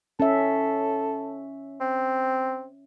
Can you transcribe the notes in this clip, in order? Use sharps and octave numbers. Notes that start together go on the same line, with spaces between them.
C#4 A4 E5
C4